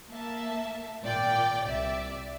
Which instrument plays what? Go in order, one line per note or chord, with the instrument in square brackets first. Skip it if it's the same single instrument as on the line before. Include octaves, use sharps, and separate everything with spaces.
[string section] A#3 E5 A5
G#1 A#2 D5 G5
C2 D5 E5